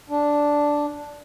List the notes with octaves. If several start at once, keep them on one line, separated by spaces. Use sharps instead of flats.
D4